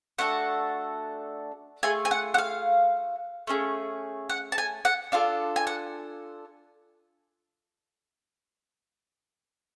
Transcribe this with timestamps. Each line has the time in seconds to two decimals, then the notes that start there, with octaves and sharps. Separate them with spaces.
0.18 A3 D4 F#4 A4 F#5
1.83 A3 F4 G#4 G#5
2.05 G#5
2.11 F#5
2.34 F#5
2.38 F5
3.47 A3 C#4 G#4
4.29 F#5
4.52 A5
4.58 G#5
4.85 F#5
5.12 D4 F4 A4 F5
5.56 G#5
5.67 F#5